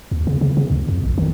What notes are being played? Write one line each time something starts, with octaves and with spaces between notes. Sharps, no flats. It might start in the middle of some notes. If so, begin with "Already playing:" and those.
D#2
C#3
C#3
C#3
D2
F2
A#1
D#3